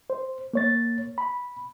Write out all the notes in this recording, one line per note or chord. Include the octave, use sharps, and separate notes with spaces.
C5
A#3 C#5 A6
B5